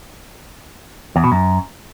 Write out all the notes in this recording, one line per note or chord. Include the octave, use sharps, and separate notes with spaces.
E2
B2
F#2